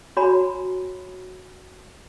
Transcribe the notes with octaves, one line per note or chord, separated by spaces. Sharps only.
F#4 C#5 G#5 A#5 B5